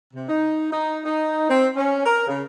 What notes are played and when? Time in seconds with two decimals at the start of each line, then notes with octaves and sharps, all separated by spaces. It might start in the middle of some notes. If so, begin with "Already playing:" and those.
0.14 C3
0.29 D#4
0.72 D#4
1.05 D#4
1.49 C4
1.76 C#4
2.05 A#4
2.27 C#3